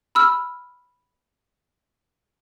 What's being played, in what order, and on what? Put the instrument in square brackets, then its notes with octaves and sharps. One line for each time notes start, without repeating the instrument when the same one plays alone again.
[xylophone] B5 E6 F6